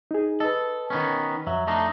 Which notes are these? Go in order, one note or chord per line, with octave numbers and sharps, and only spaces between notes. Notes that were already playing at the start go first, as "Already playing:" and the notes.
D#4 G#4
A4 B4 D#5
D#3 B3 C#4
F2 F#3 E5
A3 D4 D#4